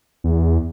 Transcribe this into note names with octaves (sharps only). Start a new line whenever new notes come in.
E2